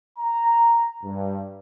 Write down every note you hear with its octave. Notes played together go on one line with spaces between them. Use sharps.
A#5
G2